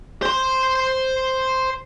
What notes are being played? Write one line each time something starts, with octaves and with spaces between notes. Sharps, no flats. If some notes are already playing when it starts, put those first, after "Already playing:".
C5 C6